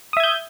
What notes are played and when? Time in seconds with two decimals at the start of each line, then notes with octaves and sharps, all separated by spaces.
0.13 D#6
0.17 E5
0.20 G#6
0.24 G6